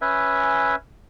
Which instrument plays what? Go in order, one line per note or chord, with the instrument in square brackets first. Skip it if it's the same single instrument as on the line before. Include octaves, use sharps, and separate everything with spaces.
[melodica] C#4 B4 E5 G#5